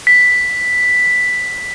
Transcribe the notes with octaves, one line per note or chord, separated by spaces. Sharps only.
B6